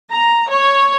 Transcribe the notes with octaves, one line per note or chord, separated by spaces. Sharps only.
A#5
C#5